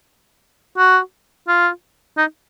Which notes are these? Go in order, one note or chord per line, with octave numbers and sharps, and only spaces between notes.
F#4
F4
D#4